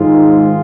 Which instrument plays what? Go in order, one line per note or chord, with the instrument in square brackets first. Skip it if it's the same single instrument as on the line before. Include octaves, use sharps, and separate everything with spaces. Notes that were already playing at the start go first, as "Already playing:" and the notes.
Already playing: [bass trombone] G#2 [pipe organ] D#3 G#3 F4